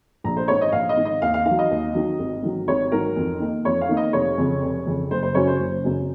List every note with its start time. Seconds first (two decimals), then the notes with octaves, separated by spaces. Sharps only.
0.24 A#1 A#5
0.37 C5
0.48 G#2 D#3 C#5
0.61 D#5
0.72 A#1 F5
0.89 D#5
0.97 G#2 D#3
1.05 D#5
1.22 D#2 F5
1.34 F5
1.45 D#3 F5
1.51 F#3
1.59 D#5
1.71 D#2
1.95 D#3 F#3
2.20 G#1
2.43 G#2 D#3 F#3
2.68 G#1 C#5
2.92 G#2 D#3 F#3 A#4
3.16 F2
3.40 D#3 A#3 D#4
3.65 F2 C#5
3.81 F5
3.89 D#3 A#3 D#4
3.97 D#5
4.13 F1 C#5
4.38 F2 C#3
4.63 F1
4.87 F2 C#3
5.11 F#1 C5
5.23 C5
5.35 F#2 C#3 F#3 C#4 C#5
5.47 C5
5.59 F#1
5.84 F#2 C#3 F#3 C#4